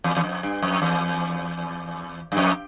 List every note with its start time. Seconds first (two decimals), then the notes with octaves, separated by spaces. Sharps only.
0.04 E2
0.17 E2
0.24 F2
0.43 G2
0.63 F2
0.82 E2
2.32 G2
2.37 F2